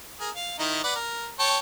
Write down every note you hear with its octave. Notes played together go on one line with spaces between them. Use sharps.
G#4 A#4
F5
D#3 D#4 E4
B4 D5 F#5
A#4
C#5 G5 A5